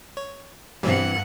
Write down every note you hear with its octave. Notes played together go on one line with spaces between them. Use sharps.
C#5
G2 B2 E3 F#3 G3 C4 F#5